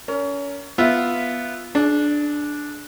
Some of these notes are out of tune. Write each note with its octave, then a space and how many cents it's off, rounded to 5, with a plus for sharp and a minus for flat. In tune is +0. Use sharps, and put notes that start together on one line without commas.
C#4 +30 A#4 -5
B3 +0 F4 +0 E5 +0
D4 +0 G#4 +40